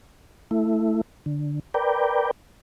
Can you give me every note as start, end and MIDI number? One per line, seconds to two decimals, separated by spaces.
0.51 1.01 57
0.51 1.01 64
1.26 1.60 50
1.74 2.31 70
1.74 2.31 71
1.74 2.31 74
1.74 2.31 79